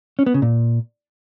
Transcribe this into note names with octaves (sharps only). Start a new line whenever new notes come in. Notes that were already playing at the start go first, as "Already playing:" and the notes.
C#4
B3
C#3
A#2